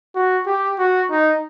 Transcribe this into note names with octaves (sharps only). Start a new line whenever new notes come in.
F#4
G4
F#4
D#4